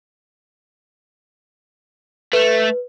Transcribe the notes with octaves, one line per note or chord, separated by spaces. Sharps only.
A3 B4